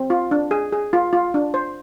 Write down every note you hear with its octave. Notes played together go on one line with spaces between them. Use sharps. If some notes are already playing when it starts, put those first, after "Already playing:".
Already playing: C4
F4
D4
G#4
G#4
F4
F4
D4
C5